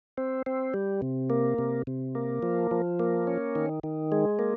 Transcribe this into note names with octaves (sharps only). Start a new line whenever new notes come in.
C4
C4
G3
C3
A#3
C3
C3
A#3
F3
F3
A#3
C#4
D#3
D#3
G#3
A#3